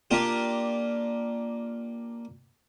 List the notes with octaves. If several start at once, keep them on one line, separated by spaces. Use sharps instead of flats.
A#3 D4 F4 G4